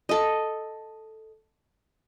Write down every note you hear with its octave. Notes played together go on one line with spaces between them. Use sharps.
A4 D#5